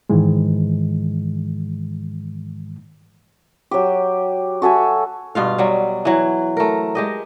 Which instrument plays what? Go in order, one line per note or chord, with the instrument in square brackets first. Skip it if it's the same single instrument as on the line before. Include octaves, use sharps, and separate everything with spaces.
[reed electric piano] G#2 D#3 E3 G#3
[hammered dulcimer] F#3 G4
F#4 A4 E5 G#5
[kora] G2 B2 F4 F5
F#3 G3
E3 F#3
A3 A#4
G#3 G4 D#5